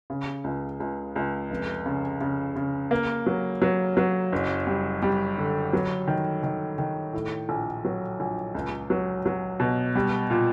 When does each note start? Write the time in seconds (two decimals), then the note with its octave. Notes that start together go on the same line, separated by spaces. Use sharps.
0.10 C#3
0.44 C#2
0.80 C#2
1.16 C#2
1.50 F1
1.86 C#3
2.21 C#3
2.56 C#3
2.91 A#3
3.26 F#3
3.62 F#3
3.97 F#3
4.32 F#1
4.67 G3
5.02 G3
5.38 D3
5.73 F#3
6.08 D#3
6.43 D#3
6.78 D#3
7.13 A2
7.49 A#1
7.85 F#3
8.20 A#1
8.55 C#2
8.90 F#3
9.26 F#3
9.60 B2
9.96 G3
10.30 A#2